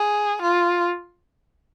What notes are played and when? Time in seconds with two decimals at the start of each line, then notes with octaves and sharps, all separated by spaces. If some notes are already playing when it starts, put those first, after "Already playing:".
Already playing: G#4
0.41 F4